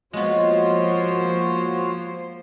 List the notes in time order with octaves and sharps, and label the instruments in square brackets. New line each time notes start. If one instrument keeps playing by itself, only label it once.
[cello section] F3 A#3 C5 [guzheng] G#3 B3 [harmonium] F4 F#4 C#5